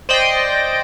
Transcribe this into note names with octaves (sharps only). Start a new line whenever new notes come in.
C5 D5 D#5 G5